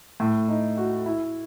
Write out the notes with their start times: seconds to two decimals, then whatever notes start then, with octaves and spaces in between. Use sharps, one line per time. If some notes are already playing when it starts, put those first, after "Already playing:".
0.20 A2
0.48 D#4
0.77 F#4
1.06 E4